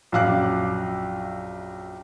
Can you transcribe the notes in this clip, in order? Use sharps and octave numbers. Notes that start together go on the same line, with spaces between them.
A#1 F#2 F5 D6 F#6